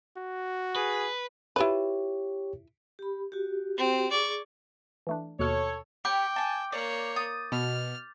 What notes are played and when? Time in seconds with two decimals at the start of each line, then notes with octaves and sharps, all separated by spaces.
0.17 F#4
0.76 G#4 B4
1.56 E4 F4 G4 B4 C#5
2.99 G4 B5
3.32 F#4 G4
3.77 C4 F#4 G4
4.11 G#4 D5 C#6
5.07 E3 A3 D4
5.39 D#2 B2 A4 C#5 F6
6.05 G4 C#5 G5 B5 D6 G6
6.36 G#5 A5
6.72 A#3 C#5 D5
7.16 D#6 A6
7.52 B2 F6